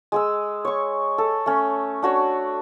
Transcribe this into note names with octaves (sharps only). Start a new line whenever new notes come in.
G#3 G#4 E6
C#5 C#6
A4
A3 C#4
D4 F#4 C#5